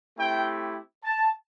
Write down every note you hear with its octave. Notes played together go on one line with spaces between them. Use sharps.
A3 C4 E4 G4 G5
A5